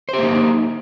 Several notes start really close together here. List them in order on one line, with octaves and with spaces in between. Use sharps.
C5 G4 A#3 D#4